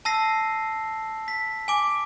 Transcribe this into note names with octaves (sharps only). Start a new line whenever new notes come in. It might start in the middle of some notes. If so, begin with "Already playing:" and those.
A5 E6 A#6 C7
B6
G#5 D6